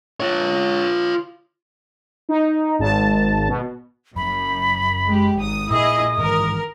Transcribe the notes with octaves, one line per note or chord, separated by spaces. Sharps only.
F4 C#5
D#4
G#1 A5
B2
F#1 F#2 B5
G#3 G4
G#1 D#6
A#2 E4 G#4 D#5 D#6
G#2 D#3 E3 A#4